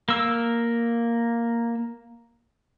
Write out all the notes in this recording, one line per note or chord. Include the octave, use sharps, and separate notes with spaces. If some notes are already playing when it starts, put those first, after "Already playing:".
A#3 E6